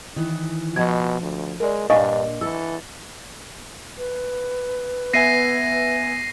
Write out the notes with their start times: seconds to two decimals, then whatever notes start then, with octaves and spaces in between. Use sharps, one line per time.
0.16 D#3 E3
0.76 B2 F3 D#5 A5 G#6
1.21 D2
1.60 G#3 A#4 D5
1.90 G2 A#2 D4 D#5 F5 G#5 C#6
2.41 E3 A4 E6
3.97 B4
5.14 B3 E5 G#5 A#6 C7 D#7